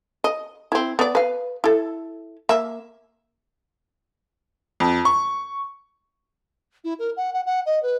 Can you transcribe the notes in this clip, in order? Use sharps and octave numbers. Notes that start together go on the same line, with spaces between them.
D#5
C4 E4
B3 D5
B4 F5
E4 A4
A#3 E5
F2
C#6
E4
A#4
F#5
F#5
F#5
D#5
B4